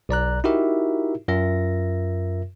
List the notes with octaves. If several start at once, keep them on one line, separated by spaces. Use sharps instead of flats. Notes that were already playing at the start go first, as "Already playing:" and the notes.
B1 D5 A#5 F#6
D#4 E4 F#4 G4 A#4 E5
F#2 F4 A#4 E5 A#6